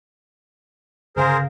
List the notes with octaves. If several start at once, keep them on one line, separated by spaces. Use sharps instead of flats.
G1 C#3 G#4 A#4 C5 F5